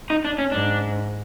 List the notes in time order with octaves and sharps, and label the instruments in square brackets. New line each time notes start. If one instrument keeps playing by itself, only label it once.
[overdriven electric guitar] D#4
D4
C#4
[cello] G#2 [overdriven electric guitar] D4